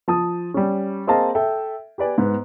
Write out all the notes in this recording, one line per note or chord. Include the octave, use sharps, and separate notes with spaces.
F3 A5 D#6
G3 C#4
A#3 C4 G#4 D#5 F5 A5
A4 E5 G5
G4 B4 D5 G#5
G#2 B3